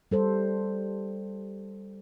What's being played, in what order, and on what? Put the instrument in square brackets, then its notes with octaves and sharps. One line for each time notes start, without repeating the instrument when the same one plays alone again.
[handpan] G3 A4 C5